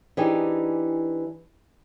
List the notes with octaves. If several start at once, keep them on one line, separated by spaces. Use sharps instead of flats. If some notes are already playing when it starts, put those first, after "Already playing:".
E3 C4 D4 D#4 G4 G#4